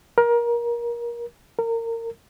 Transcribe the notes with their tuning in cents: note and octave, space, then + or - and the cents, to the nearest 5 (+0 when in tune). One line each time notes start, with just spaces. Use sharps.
A#4 +25
A#4 -25